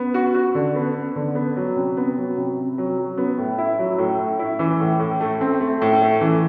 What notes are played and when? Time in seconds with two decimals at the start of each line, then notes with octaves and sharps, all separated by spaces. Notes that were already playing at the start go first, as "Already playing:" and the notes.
Already playing: B3
0.14 F#4
0.35 F#4
0.55 D3
0.75 B3
0.96 B3
1.16 D3
1.35 B3
1.56 F#3
1.76 C3
1.97 B3
2.17 F#3
2.37 C3
2.57 C3
2.78 F#3
2.98 F#3
3.18 B3
3.38 A2
3.58 E4
3.79 F#3
3.98 A2
4.19 A2
4.39 E4
4.59 E3
4.80 A2
5.00 A2
5.20 A3
5.41 C4
5.60 A3
5.82 A2
6.02 A3
6.21 E3